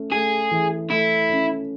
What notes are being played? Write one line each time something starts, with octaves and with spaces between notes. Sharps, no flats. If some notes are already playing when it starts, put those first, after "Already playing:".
Already playing: A3 C#4
A3 G#4
E3
A3 E4
C#4